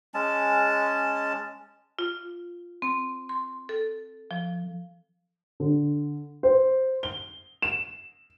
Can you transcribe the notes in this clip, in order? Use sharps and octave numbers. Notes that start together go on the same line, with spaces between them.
G#3 C#4 A5
F4
C4
C6
A4
F3
D3
C5
G7
E7